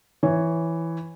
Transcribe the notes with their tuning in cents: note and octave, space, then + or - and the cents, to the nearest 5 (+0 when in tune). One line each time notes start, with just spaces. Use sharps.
E3 +0 C#5 +0